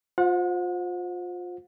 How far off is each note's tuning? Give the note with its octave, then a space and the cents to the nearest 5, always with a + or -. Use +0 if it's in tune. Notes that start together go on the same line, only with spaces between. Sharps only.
F4 +25 C5 +0 F#5 -35